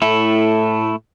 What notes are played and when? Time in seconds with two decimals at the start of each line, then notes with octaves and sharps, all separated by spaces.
0.02 A2 A3 E4